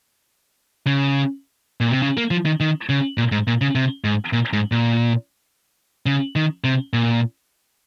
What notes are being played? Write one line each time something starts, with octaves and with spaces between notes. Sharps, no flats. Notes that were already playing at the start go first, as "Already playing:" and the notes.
C#3
A#2
C3
C#3
A#3
F3
D#3
D#3
C#3
A#2
G#2
A#2
C#3
C3
G#2
A#2
G#2
A#2
C#3
D#3
C3
A#2